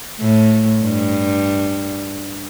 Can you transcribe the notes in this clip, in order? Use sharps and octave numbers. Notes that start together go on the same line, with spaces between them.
A2
G2